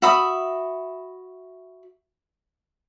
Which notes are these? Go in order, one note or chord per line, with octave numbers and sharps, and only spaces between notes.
F#4 E5 B5 D#6